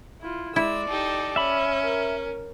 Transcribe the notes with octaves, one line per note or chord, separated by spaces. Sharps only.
E4 F4
G#3 E4 D5 E6
D#4 G4 A4
C#4 E5 B5
A#4